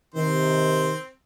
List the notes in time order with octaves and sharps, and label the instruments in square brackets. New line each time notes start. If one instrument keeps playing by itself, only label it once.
[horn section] C3 D#3 [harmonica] C4 C5